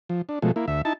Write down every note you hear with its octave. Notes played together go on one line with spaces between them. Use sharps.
F3
D4
B2 F3 G#3 A3
A#3 E4
D2 E5
D#4 E4 A5